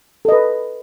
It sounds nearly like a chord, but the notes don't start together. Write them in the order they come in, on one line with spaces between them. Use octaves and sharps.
A4 D#5 B4